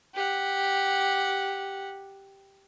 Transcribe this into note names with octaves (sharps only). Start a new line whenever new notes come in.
G4 F#5